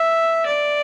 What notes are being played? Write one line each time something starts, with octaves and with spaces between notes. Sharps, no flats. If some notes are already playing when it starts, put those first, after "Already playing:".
Already playing: E5
D5